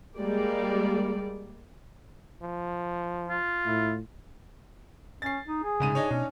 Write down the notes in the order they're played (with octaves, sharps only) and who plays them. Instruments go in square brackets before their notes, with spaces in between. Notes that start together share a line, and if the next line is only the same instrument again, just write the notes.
[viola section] G3 G#3 A#3 D5
[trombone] F3
[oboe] F4
[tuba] A2 [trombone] E4
[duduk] C#4 [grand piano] A6 C7
[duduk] D#4
G#4
[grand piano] C2 G#2 D#7 [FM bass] C#3
[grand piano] D4 D#4 C#5
[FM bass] B2 [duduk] C#4